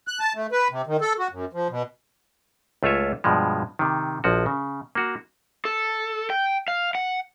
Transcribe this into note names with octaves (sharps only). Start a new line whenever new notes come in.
F#6
A5
A3
B4
C3
D#3
A4
F#4
F#2
F3
B2
C#2 A3 F4 C#5 E5
G2 B2 F3 G#3
C3 D#3
A#1 F3 F#4
C#3
A#3 F#4
A4
G5
F5
F#5